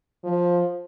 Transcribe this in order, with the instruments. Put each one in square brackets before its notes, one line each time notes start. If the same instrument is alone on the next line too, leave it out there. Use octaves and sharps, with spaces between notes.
[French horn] F3